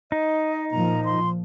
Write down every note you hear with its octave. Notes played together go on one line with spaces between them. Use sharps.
D#4 D#5
A#2 F3 A#5
C6